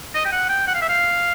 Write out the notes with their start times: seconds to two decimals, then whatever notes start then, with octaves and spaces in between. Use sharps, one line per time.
0.15 D#5
0.25 G5
0.32 F#5
0.49 G5
0.67 F#5
0.74 F5
0.81 E5
0.89 F5